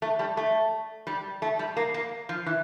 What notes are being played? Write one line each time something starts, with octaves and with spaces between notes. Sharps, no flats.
A3
G3
A3
G3
A3
G3
A#3
A#3
F3
E3